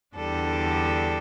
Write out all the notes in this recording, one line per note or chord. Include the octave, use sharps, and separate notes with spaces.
E2 D3 G3 D4 A4